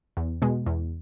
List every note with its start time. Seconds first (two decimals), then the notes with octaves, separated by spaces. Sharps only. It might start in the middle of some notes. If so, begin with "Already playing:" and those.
0.17 E2
0.42 B2 G#3
0.66 E2